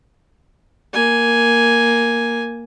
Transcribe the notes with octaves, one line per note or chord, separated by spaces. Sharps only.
A#3 G#5